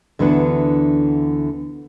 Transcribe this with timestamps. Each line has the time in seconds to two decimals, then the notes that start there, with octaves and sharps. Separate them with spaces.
0.19 D2 D3 E3 B3 D4